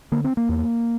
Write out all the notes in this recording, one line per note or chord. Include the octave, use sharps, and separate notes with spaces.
D3 A#3
C4
A#3
E2